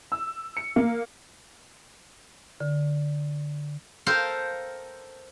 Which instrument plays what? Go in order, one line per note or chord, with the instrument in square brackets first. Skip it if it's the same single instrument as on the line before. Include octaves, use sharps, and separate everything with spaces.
[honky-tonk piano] E6
C#7
A#3
[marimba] D3
[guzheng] A4 A#4 C5 F5 G5